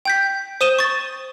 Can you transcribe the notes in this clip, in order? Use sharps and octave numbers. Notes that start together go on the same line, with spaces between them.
G5 G6 B6
C5 D#6 D#7 E7 G7
C#6 A6